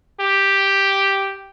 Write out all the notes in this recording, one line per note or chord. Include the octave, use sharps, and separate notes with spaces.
G4